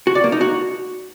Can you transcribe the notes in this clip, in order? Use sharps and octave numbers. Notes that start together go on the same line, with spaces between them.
F#4
D5
A#3
D#4
F#4